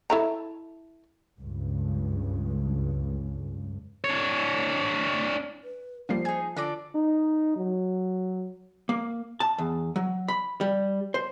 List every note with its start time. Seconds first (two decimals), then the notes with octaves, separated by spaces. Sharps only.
0.10 E4 A4 A#5
1.39 C#2 G2
4.04 D4 C#5
5.62 B4
6.09 F3 G3 A#3 F4 C5 C7
6.25 D#4 G#4 G#6
6.56 D3 D4 F4 A4 D5 A#6 D7
6.95 D#4
7.56 F#3
8.89 A#3
9.40 A5
9.58 E2
9.96 F#3
10.28 B5
10.61 G3
11.14 C5